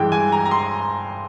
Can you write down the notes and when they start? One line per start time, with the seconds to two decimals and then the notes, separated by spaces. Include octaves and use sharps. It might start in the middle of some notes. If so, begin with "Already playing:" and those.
Already playing: G2 E3 G#3 G5
0.12 G#5
0.32 A#5
0.45 A#5
0.51 C6